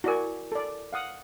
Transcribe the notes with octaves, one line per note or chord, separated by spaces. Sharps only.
E4 F#4 A#4 D5 G#5
A4 D5
F5 F#5 D#6